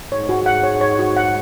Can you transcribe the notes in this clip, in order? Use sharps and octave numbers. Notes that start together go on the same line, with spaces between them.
G#2 C#5
F#4
F#5
C#5
C#5
F#4
F#5